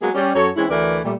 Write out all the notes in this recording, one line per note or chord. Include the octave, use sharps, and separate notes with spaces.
F#3 G#3 A#3 B3 G#4
G3 C#4
F#2 F#3 A4 C#5
E3 G#3 C4 C#4 E4
D2 E3 A3 A#4 B4 D5
A#2 G3 A3